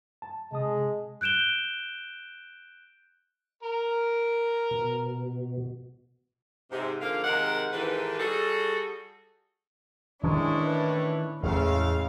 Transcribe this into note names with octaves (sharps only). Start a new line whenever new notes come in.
A5
C3 G#3 A5 D#6
F#6 G6 D7 E7 G7
A#4
B2
G#2 C3
G#2 D3 F3 A#3 F5
C3 D#3 G#3 A#4 F#5
G#2 D#3 E3 G4 A4 B4
G3 F#4 G#4 A4
A2 D#3 E3 G#3 C#4 D4 E4 C#5
B4
E2 A2 C#3 E3 G#3 A3 F5